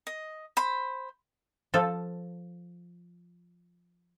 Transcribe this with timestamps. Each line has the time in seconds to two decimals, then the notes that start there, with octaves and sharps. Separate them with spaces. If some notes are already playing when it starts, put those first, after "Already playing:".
0.07 D#5
0.57 C5 B5
1.74 F3 A4